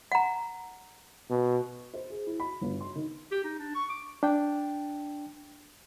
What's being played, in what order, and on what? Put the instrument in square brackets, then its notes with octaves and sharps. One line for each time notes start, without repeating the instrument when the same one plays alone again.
[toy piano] F#5 A#5
[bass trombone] B2
[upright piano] C5
G#4
E4
B5
G1
C6
D#3
[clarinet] G4
D#4
D4
C#6
D6
[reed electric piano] D4 G5